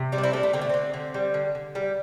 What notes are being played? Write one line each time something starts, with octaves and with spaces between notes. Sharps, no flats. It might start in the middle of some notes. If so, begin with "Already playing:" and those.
Already playing: C3
G3 C4
D4
C4 E4
G3 A3 D4
A3
D3 C4
A3
D3 C4
D3
G3
D3
D3
G3